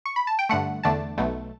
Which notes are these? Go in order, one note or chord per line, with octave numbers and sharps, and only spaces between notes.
C#6
B5
A5
G5
G2 D3 A3 F#5
E2 D3 A3 D4 A5
B1 B2 A3